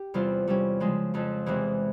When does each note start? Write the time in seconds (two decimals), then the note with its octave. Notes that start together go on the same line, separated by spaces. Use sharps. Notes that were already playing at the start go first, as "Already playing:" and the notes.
Already playing: G4
0.14 E2 C3 G3 C4 F4
0.47 C3 G3 C#4
0.80 C#3 F3 G#3
1.14 F2 C#3 F3
1.46 E2 C3 E3 G#3